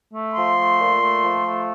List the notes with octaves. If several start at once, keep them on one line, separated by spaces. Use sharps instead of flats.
A3
F3 C6
A3
A#2
A3
F3
A3